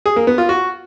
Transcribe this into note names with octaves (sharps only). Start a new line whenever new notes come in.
G#4
A#3
B3
F4
F#4